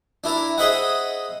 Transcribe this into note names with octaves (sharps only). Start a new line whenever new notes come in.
D4 E4 A#4
G#4 C5 D#5 E5 F#5